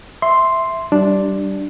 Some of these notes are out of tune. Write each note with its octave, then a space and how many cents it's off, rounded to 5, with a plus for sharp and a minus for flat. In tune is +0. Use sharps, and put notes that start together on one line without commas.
E5 +0 C6 +0
G3 -15 D4 +0